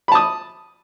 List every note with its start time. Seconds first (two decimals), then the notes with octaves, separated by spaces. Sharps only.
0.08 B5
0.12 A5
0.15 D#6